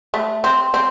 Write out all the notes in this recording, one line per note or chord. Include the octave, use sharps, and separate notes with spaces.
A3
C4
C4